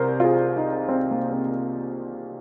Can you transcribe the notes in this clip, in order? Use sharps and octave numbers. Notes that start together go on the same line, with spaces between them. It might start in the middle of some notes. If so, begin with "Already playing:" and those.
Already playing: C2 A#4 C5
F4
G#4
D#4
C4
A#3
C4